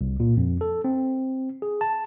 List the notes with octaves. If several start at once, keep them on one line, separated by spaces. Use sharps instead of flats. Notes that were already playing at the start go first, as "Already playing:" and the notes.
C2
A#2
F2
A4
C4
G#4
A5